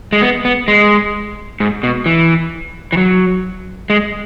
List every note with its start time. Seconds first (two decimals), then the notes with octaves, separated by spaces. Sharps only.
0.13 G#3
0.22 B3
0.45 B3
0.68 G#3
1.60 G#2
1.83 B2
2.06 E3
2.92 E3
2.97 F#3
3.90 G#3